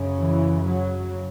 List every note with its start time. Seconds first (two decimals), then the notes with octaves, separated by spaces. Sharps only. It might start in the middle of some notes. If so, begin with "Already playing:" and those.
Already playing: F#2 C#3
0.20 E3
0.67 F#3